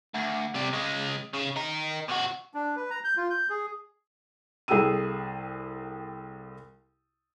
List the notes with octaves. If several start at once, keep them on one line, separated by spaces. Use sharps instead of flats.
D2
C3 G3
C#3 G#3
C#3
D#4 A#4
C3 F#4
D4
B4
A#5
G6
F4
G6
G#4
C2 G#4 A4 G5 E6 D#7